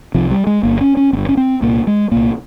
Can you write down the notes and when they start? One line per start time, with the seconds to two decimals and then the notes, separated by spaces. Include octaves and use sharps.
0.15 C2 C3 F3
0.31 G3
0.47 G#3
0.63 G1 G2 A#3
0.81 C#4
0.97 C#4
1.13 G1 C4
1.17 G2
1.29 C#4
1.37 C4
1.62 C2 A#2 A#3
1.87 G#3
2.12 C2 A#2 A#3